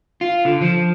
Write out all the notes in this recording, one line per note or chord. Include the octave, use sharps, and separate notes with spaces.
F4
D3
F3